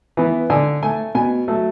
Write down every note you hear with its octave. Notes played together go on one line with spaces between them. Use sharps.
E3 B3
D3 G#5
A3 G#5
B2 G#5
F#3 A3